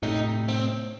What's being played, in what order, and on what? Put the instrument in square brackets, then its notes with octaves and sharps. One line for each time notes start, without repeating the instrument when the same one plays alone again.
[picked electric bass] A2 C3 [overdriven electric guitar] D#4
[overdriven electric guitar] C4